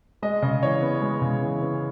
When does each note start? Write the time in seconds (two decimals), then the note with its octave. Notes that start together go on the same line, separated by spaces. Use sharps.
0.22 G#3 D#5
0.42 C#3 D#5
0.62 E3 C#5
0.82 B3
1.01 G#3
1.22 C#3
1.42 E3
1.61 B3